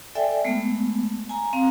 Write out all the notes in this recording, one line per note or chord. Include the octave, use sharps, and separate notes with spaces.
A4 D5 E5 G5 G#5
G#3 A3 B3
G#5 A#5
C4 F5 A#5